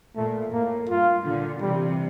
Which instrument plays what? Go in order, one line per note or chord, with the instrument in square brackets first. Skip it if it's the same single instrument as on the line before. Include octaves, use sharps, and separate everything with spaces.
[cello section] A#2 [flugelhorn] A3
[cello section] A2 [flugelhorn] A#3
[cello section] G2 [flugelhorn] F4
[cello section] A#2 D3
[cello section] C3 E3 [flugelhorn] G3